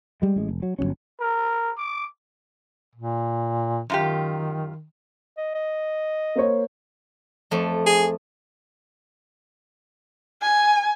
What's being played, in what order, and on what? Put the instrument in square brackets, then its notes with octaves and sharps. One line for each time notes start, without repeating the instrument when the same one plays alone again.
[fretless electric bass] G3 G#3
A1 G#3
F1
F#3
G1 G2 F#3 C#4
[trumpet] A#4
D6
[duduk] A#2
[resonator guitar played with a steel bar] F#2 F4 G4 [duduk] D#3
[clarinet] D#5
D#5
[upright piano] A#3 C5 C#5
[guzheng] F2 A3
[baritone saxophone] G#4
[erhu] G#5